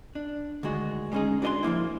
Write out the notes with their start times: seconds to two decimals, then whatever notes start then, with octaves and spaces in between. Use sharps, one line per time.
0.15 D4
0.63 D2 D#3 G#3 F#4
1.12 G3 G#3 B3 C#4 D#4 G#4
1.42 D4 F#4 A#4 D#5 G#5 C6
1.63 F3 G#3 A#3 E4